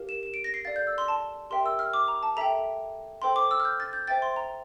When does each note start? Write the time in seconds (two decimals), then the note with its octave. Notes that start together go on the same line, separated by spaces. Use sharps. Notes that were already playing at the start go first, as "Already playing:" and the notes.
Already playing: G4 A#4 F5
0.09 E7
0.23 E7
0.34 D7
0.44 A#6
0.54 C7
0.65 A4 D5 F5 A6
0.76 G6
0.87 E6
0.98 C6
1.08 A5
1.50 G4 A#4 E5 G5 C6
1.66 E6
1.79 F6
1.94 D6
2.08 A#5
2.23 A5
2.37 A4 E5 G5 A#5
3.22 A4 C5 G5 C6
3.36 D6
3.51 E6
3.60 F6
3.65 G6
3.80 A6
3.93 G6
4.08 C5 E5 G5 A6
4.22 C6
4.36 A#5